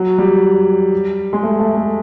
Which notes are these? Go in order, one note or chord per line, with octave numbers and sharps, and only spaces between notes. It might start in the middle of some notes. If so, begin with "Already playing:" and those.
Already playing: F#3
G3
G#3
A3
A3
A3